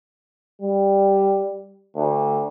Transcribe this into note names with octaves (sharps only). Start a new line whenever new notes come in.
G3
D2